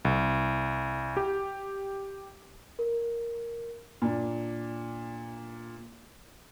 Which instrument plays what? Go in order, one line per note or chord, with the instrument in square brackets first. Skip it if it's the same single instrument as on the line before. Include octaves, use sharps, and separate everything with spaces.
[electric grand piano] C2
G4
[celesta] A#4
[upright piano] A#2 D4